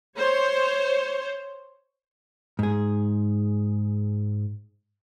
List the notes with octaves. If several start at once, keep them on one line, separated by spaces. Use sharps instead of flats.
C5 C#5
G#2 G#4